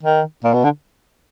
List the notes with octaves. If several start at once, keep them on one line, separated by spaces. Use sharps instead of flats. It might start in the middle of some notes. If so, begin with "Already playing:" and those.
D#3
A#2
B2
D3